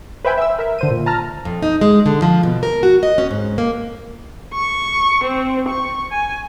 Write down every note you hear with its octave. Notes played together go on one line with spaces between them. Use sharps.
B4 C5 E5 G5 G#5 B5
E5 E6
A#4 E5
D3 C5 D#7
A#2
A5 A#5 F6
F2
D#4
G#3
D3
F3
B2
A#4
F#4
D#5
C#4
G#2
A#3
C#6
C4
C#6
G#5